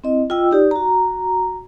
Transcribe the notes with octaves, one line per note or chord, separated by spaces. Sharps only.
C4 E4 D#5
F4 D#5 G5 E6
D#4 G4 D5
F#4 A#5